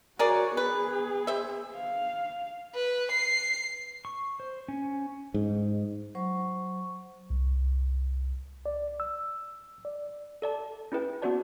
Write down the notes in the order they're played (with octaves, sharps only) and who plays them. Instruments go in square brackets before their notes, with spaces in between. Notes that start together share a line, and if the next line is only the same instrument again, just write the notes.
[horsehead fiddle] F#4 C#5 [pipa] G#4 A#4 D5
[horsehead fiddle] B3 G#4 [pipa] B4
[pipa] C5 E5
[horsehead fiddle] F5
[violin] B4
C7
[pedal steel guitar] C#6
C5
C#4
[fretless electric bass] G#2
[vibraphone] F#3 C5 C#6
[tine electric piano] C2
D5
E6
D5
[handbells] A4 D5 A5
C#4 E4 G#4 B4 G5
B3 C#4 F#4 C5 D5 A5